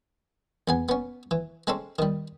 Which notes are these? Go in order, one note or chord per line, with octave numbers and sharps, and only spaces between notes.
E2 B3 G#5
B3 C#4
E3
G#3 C4 C#4 A4
D#3 G3